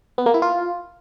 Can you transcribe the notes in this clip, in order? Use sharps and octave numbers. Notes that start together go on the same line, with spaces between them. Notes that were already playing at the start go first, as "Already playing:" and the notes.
B3
A#3
E4
F4